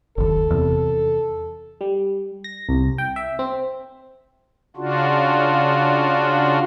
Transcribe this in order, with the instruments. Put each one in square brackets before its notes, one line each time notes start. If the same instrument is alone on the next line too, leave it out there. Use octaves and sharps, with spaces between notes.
[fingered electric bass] F#1 D#2 [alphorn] A4
[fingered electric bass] E2 C3
[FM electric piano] G3
A#6
C2
G5
E5
C4
[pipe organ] C#3 D4 F4 F#4